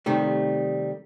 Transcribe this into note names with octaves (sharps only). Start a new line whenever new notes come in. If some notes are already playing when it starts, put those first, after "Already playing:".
C3 D#3 G3 A3